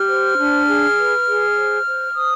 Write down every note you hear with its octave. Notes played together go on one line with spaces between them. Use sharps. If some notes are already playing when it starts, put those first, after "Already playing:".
Already playing: G4 F6
C5
D4
G#4
B4
G#4
C5
C5
C5 D#6